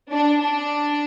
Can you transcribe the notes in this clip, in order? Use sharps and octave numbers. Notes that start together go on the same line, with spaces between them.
D4
D4